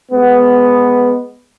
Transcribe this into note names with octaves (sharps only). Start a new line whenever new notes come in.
G#3 B3